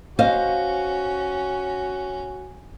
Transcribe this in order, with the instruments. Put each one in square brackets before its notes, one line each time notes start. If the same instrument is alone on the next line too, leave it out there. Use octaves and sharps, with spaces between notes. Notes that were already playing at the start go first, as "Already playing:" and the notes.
[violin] C#4 [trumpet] F#4 [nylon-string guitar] C5 D#5 F5